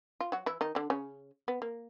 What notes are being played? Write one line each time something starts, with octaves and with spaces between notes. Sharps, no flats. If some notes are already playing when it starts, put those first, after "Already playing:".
F4
F#3 F#4
E3 E4
D#3 D#4
D3 D4
C#3 C#4
B3
A#3